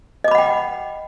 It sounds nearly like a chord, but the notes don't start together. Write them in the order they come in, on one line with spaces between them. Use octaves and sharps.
D#5 D6 B5 F#5 G5